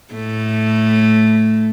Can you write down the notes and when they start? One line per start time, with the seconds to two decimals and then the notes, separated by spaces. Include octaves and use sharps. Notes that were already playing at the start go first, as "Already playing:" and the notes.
0.13 A2 A3